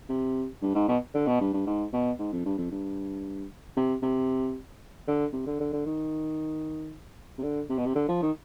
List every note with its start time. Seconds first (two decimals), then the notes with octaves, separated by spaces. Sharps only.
0.09 C3
0.62 G2
0.75 G#2
0.88 B2
1.14 D3
1.27 B2
1.41 G2
1.54 G2
1.66 G#2
1.93 B2
2.19 G#2
2.33 F2
2.45 G2
2.58 F2
2.72 G2
3.77 C3
4.02 C3
5.07 D3
5.33 C3
5.46 D3
5.60 D3
5.73 D3
5.86 D#3
7.38 C3
7.43 D3
7.70 C3
7.78 B2
7.86 C3
7.95 D3
8.09 F3
8.22 D#3